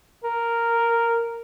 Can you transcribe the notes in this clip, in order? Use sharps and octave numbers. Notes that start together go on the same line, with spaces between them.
A#4